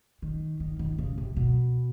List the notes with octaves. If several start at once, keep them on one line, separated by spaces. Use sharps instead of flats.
D#3
D#3
D#3
C#3
C3
B2